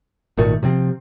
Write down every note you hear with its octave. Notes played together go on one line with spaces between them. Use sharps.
G#1 A#2 D#3 A3
C3 F3 C4